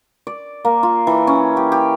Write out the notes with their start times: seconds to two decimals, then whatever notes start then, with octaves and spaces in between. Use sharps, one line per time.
0.27 D5
0.65 A#3
0.83 F4
1.07 E3
1.27 C#4
1.57 G4
1.72 G4